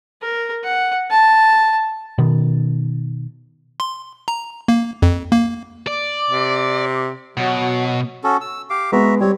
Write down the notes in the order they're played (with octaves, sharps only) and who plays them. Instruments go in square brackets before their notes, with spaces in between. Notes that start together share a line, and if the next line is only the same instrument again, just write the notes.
[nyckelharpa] A#4
F#5
A5
[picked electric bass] B2 D#3
[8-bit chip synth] C6
A#5
A#3
F2
A#3
[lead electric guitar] D5 [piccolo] D6
[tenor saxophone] C3
[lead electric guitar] B2 [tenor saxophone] F#3 [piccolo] F#5
[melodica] C#4 F#4 A4
E6
G4 F5 D6
[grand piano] G#3 B3 [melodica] F#4 E5 A#5
[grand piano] G3 [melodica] C4 C#5